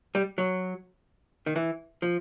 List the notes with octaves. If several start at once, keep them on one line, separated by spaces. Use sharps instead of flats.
G3
F#3
D#3
E3
F3